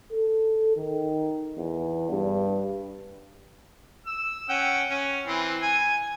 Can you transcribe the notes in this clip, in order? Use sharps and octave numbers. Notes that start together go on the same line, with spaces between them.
A4
D#3
E2
G2
E6
C#4 F#5 G5
C#4
E3 C4
G#5